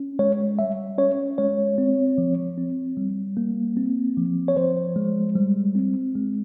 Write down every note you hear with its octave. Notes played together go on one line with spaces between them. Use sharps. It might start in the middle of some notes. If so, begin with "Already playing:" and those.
Already playing: C#4
G#3 C#5
G3 E5
C#4 C#5
G#3 C#5
C4
F3
C4
G3
A#3
C4
F3
C#5
F3 C5
G#3
G3
C4
G#3